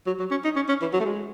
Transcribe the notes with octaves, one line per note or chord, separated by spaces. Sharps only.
F#3
F#3
C#4
D#4
C#4
C#4
E3
F#3
A3
G#3